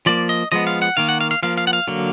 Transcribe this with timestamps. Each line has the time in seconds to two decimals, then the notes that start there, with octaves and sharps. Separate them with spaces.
0.06 F3 A#3 D5
0.29 D#5
0.52 F3 G#3 B3 D#5
0.67 F5
0.82 F#5
0.97 D#3 A#3 F5
1.09 F#5
1.21 F5
1.31 F5
1.43 F3 A#3 F5
1.58 F5
1.67 F#5
1.73 F5
1.88 D3 F#3 A#3